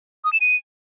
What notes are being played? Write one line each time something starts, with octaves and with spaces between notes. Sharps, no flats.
D#6
E7
D#7